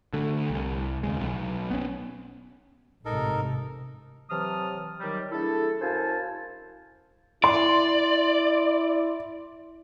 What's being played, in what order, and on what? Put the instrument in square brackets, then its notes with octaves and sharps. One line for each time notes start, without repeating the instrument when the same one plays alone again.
[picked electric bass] D3 A3
C2
D#2 C#3 G#3
B1
B3 C#4
[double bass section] A1 G#2 C3 [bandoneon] D#4 A4 A#4
[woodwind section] C3 E3 F#3 A5 D#6 F6
D#3 F#3 G3
A3 D4 E4 G#4 A4
F#2 E4 C5 F5 G#5 A5
[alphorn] E4 [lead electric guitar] D5 [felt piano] C6